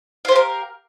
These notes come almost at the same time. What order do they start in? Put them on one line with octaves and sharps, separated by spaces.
F5 C5 G4 A#4